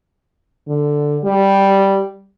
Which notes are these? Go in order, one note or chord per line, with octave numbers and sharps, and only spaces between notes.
D3
G3